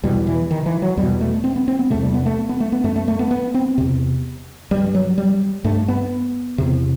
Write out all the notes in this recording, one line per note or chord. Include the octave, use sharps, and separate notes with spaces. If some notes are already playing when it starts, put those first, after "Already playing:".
E2 B2 G3
E3
D#3
E3
F#3
E2 B2 G3
A3
C4
B3
C4
B3
E2 C3 A3
G3
B3
A3
B3
A3
B3
F#2 A3
A3
A3
B3
B3
C4
E2 C3
G2 G3
F#3
G3
G2 A3
B3
E2 C3